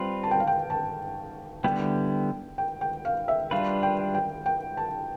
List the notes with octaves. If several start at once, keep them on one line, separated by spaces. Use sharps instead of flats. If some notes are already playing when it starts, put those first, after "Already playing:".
Already playing: G3 C4 F4 B4
A5
G5
F5
G5
A5
D3 G3 B3 E4 G5
G5
G5
F5
E5
G3 D4 F4 B4 F5
G5
G5
G5
A5